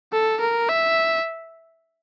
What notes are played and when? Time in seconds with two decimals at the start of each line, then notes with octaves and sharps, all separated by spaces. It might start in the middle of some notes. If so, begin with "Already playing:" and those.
0.13 A4
0.40 A#4
0.69 E5